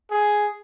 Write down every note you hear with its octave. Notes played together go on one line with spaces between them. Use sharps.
G#4